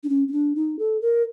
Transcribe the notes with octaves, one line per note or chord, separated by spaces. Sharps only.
D4
C#4
C#4
D4
D#4
A4
A#4